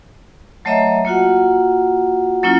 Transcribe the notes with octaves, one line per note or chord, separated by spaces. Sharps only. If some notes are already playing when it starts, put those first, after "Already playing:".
F#3 A3 C#5 D#5 E5 A#5
A#3 F4 F#4 F#5
F#3 A#3 C#4 E4 F4